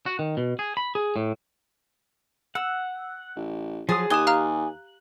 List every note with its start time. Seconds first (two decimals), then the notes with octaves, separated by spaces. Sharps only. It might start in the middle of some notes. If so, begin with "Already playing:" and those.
0.06 F#4
0.19 D#3
0.37 B2
0.59 G#4
0.77 B5
0.95 G#4
1.16 A2
2.55 F#5 E6
3.36 A1
3.89 F3 F#3 G#4 A5 C6 D#6
4.10 D#2 G4 G#5 D#6 F#6 G7
4.27 F5 A#5 F6